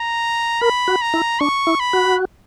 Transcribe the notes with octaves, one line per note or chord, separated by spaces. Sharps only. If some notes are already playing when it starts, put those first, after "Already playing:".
Already playing: A#5
A#4 B5
F#4
A#5
E4
D4 C#6
E4
B5
F#4